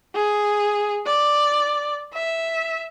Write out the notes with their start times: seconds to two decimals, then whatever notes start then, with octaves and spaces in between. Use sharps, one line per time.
0.15 G#4
1.06 D5
2.14 E5